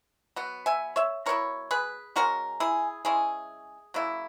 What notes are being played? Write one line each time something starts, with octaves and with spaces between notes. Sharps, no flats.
F#3 B3
E5 G#5
C#5 E5
F#3 B3 E4 A#4 C#5
G#4 B4
C#3 G#3 C#4 F#4 A#4
E4 G#4
C#3 G#3 C#4 E4 G#4
C#3 F#3 A#3 E4